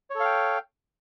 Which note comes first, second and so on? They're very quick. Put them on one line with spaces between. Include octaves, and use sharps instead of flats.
C#5 A4 F5 G5